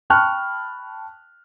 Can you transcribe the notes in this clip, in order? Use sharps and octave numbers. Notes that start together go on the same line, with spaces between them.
G5 A5 B5 C#6 F6 F#6